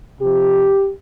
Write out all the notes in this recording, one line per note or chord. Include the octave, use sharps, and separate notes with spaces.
C3 F3 G4